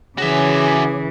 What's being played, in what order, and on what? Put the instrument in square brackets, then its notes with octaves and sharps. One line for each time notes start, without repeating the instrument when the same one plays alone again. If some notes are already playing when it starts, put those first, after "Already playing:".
[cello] C#3 E3 [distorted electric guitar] F#4 E5 [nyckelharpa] G#4 [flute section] C#5 G#5 D6